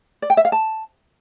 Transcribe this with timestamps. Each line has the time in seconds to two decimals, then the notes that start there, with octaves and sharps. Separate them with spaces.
0.22 D5
0.30 G5
0.37 E5
0.45 F5
0.52 A5